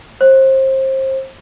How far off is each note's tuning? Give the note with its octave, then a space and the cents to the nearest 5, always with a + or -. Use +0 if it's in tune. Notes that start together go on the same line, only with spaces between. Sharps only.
C5 +30